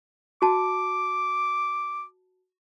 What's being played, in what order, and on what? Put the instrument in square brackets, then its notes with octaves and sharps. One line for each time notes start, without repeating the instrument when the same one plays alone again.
[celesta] F#4 A5 [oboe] D6